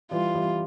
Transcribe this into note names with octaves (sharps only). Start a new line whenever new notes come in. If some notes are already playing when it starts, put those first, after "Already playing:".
E3 G3 F4
E3 G3